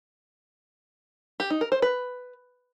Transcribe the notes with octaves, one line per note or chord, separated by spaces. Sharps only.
G4
D#4
A#4
C5
B4